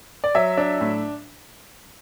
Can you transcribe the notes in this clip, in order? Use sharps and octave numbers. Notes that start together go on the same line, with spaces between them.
D5
F#3 E5
D4
A2